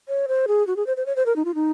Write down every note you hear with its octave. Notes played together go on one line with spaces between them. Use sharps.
C#5
C5
G#4
F#4
G#4
C5
C5
C#5
C5
A#4
D#4
F4
D#4